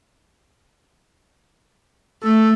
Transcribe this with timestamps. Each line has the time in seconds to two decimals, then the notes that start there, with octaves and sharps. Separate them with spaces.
2.24 A3 A4